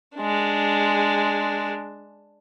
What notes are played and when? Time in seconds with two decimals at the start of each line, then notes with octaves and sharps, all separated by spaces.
0.17 G#3 D4